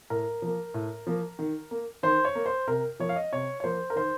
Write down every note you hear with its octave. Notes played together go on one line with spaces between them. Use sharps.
A2 A#4
F3 A#3
A2
F3 A#3
D#3
A#3
D#3 C5
C#5
A#3
C5
C3 A#4
F3 A#3 C#5
F5
D#5
C3 C#5
C#5
F3 A#3 C5
A#4
D#3 C5